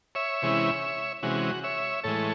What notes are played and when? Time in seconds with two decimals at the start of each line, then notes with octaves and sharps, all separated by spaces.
0.15 C#5 E5
0.42 C3 E3 G#3 C#4 E4
1.23 C3 E3 G#3 C#4 F#4
1.64 C#5 E5
2.04 A2 E3 G#3 A4 C#5